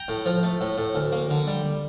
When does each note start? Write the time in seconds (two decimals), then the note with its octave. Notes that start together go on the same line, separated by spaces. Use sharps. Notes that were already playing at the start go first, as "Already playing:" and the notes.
Already playing: G5 A#5
0.08 A2
0.26 F3
0.43 A3
0.61 A2
0.78 A2
0.95 D2
1.12 A#3
1.30 D3
1.47 G3